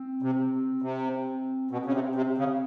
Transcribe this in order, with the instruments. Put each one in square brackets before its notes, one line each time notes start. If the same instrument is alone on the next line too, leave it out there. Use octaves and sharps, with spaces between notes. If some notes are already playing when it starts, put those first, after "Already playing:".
Already playing: [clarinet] C4
[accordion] C3
C3
[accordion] B2 [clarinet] C4
[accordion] C#3
C3
C3
C#3